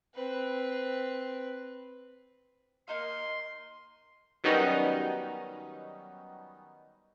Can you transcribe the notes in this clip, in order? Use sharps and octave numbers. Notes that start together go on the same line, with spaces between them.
C4 B4
A#3 D#4 F5 C6
D#3 F#3 G3 B3 C#4 D#4